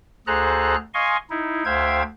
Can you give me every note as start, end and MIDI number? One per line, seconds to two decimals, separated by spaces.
0.27 0.76 38
0.27 0.76 68
0.27 0.76 69
0.27 0.76 72
0.27 0.76 82
0.27 0.76 90
0.94 1.17 75
0.94 1.17 77
0.94 1.17 80
0.94 1.17 84
0.94 1.17 85
1.30 1.64 63
1.30 1.64 64
1.65 2.03 38
1.65 2.03 72
1.65 2.03 76
1.65 2.03 77
1.65 2.03 79
1.65 2.03 92